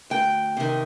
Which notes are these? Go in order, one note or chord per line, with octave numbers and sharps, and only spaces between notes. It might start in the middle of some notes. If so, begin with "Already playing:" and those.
D2 G5
C3 D#3